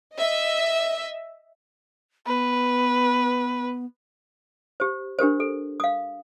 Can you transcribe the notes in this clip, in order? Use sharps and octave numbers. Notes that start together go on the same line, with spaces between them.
D#5 E5
B3 B4
G4 C5
D4 G4 A#4 C5
A4
F5 D#6